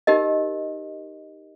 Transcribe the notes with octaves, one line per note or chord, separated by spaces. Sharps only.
D#4 G4 A#4 D#5